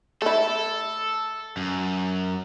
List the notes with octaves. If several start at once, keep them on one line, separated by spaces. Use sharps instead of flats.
A3 E4 A4
F#2